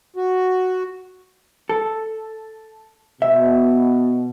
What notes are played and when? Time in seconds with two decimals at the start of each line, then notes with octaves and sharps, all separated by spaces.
0.16 F#4
1.69 A4
3.22 B2 E5